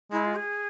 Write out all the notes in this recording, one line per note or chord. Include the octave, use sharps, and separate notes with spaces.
G#3 E4
F4
G#4